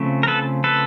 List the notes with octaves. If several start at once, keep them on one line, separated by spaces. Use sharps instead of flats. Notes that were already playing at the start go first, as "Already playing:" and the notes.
Already playing: C#3 F3 A3 C4
A#4
A4 B4
A4 B4